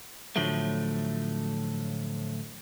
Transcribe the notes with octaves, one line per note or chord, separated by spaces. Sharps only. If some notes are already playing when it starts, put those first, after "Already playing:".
A2 D3 F3 F#3 A3